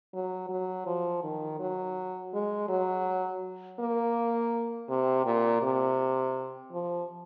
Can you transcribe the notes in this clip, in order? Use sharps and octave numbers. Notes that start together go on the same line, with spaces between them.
F#3
F#3
F3
D#3
F#3
G#3
F#3
A#3
C3
A#2
C3
F3